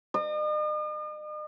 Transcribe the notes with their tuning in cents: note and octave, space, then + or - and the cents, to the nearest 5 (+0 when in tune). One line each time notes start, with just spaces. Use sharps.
D#5 -45